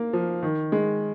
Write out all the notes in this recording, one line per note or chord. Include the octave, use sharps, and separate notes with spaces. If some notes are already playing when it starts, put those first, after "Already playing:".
Already playing: A#3
F3
D#3
G#3